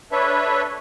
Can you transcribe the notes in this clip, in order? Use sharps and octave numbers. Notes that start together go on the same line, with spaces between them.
D4 A4 B4 C#5 E5